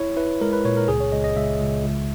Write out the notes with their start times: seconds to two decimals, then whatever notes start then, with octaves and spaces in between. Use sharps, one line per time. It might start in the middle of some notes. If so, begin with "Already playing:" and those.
Already playing: E4 C#5
0.17 E4 B4
0.41 G#3 A#4
0.53 B4
0.65 A#2 C#5
0.77 A#4
0.88 C#2 G#4
1.00 C#5
1.12 C#2 D#5
1.24 D#5
1.36 C#2 E5
1.61 C#2
1.84 C#2